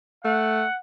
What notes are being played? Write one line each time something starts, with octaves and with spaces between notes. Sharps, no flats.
A3 F#5